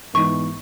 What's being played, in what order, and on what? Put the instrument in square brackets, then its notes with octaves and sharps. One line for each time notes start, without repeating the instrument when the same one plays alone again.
[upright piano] G#2 E3 B3 D#4 [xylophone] C#6